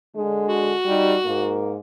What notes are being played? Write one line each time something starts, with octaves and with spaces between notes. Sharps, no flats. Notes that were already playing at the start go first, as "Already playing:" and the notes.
D3 G#3
F#4
G3 D#4 G4
G#2 A#3